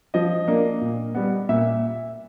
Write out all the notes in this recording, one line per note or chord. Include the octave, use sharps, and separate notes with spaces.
F3 D#5
A#3 D4
A#2
G3 B3
A#2 E5